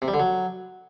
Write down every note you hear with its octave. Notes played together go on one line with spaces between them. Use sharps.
C3
G3
D3
F#3